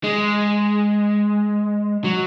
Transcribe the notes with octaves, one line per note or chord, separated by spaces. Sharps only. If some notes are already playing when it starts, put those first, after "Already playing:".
G#3
F#3